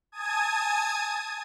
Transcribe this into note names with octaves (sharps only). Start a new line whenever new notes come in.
G#5 A5 D#6 G#6 D#7